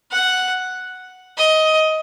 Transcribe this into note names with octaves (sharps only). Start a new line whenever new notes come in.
F#5
D#5